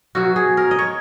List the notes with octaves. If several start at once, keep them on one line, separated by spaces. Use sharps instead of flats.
B2 F#3 F#4
G#4
A#4
D#5
C#5